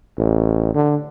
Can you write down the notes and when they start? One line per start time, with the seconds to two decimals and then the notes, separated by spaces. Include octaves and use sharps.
0.18 A1
0.74 D3